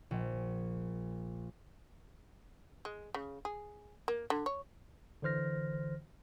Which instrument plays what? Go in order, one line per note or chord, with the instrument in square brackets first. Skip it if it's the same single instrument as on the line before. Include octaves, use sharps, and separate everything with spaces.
[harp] A#1
[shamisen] G#3
C#3
G#4
A#3
D3
C#5
[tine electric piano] D3 E3 C5 F6 A#6